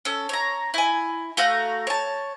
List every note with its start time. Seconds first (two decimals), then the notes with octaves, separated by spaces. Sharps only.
0.05 C#4 A4
0.29 C#5 A#5
0.74 E4 G#5
1.37 A3 F#4 F5 A#5
1.87 C#5 A5